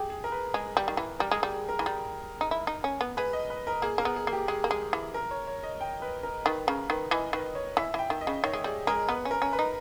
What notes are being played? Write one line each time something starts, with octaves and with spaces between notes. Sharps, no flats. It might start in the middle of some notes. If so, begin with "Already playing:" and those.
Already playing: G4 G#4
G#4
A#4
B4
G#3
G3
D#3
E3
G3 A#4
G#3
G#4
G3
G#4
A#4
E3
G3
D#4
E4
D#4
C#4
B3
G#3 B4
D#5
B4
A#4
A#3 G#4
A#3 A#4
B3
G#4
A#3
G4
G#3 G#4
A#3
G#3
E3
A#4
C#5
C#5
D#5
G5
B4
A#4
D#3 B4
C#3 A#4
D#3 B4
E3 D#5
D#3 B4
C#5
E3 E5
E3 G5
D#3
D#5
C#3
D#3 C#5
G#3
G3 G#4
G#3 A#4
B3 B4
C#4
A#4
C#4
B4
D#4